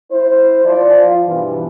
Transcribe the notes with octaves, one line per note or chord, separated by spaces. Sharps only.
E4 C5
F3 D5
F4
G2 B2 E3